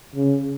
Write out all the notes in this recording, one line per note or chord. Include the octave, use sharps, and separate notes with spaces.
C#3